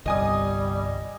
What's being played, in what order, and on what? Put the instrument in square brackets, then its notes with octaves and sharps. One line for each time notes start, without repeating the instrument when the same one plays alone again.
[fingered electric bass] G1 C2 [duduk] G3 [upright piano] D#5 G#5 D#6